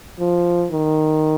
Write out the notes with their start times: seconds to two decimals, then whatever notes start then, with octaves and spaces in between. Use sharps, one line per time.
0.19 F3
0.72 D#3